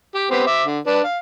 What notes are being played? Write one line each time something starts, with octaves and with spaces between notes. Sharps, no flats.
G4
B3 C4 G4
E5 D6
D3
D4 B4
F5